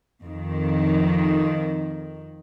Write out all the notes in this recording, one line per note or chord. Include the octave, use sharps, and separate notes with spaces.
F2 D#3